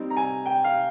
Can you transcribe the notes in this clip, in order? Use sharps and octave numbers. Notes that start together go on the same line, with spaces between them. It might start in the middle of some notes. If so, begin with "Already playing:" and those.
Already playing: G3 C4 D#4
A#5
G#5
G5
F5